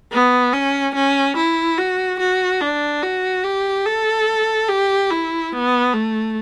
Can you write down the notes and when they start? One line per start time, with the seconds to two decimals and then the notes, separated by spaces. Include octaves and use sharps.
0.12 B3
0.53 C#4
0.95 C#4
1.36 E4
1.78 F#4
2.20 F#4
2.61 D4
3.03 F#4
3.44 G4
3.86 A4
4.68 G4
5.10 E4
5.52 B3
5.93 A3